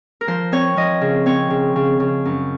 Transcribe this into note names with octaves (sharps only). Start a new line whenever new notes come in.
A#4
F3 C5
C4 C#5
F3 D#5
C#3
C4 C#5
C#3
C#3
C#3
F#2